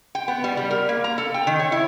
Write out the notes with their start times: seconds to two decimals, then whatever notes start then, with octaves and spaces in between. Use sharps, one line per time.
0.15 G5
0.28 B3
0.44 G3
0.57 G3
0.71 A#4
0.89 A#3
1.04 A#5
1.18 A4
1.34 G5
1.47 D#3
1.59 C#5
1.72 E4